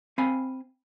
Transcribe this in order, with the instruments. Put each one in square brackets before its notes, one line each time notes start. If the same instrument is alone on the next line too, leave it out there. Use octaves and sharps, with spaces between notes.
[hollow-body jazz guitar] C4 F5 G#5 B5